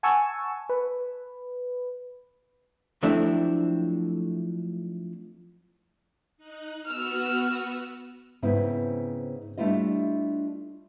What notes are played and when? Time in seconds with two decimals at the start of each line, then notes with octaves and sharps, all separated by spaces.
0.03 F#5 G#5 A5 C#6 E6
0.69 B4
3.03 F3 F#3 A3 C4 D4 E4
6.37 D#4 F#6
6.86 B3 F#4 B4 E6 F6
8.42 G#2 C#3 B3 C4 E4
9.58 G3 A3 D4 E4 F4 D#5